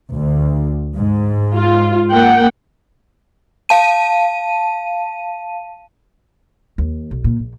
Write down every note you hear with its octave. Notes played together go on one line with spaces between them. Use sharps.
D2
G#2
F4
A#3 F#5 G5
F5 A5 D#7
D#2
B1
A#2
A#1